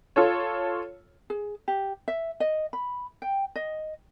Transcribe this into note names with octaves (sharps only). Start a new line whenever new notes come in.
F4 A4 C#5
G#4
G4
E5
D#5
B5
G5
D#5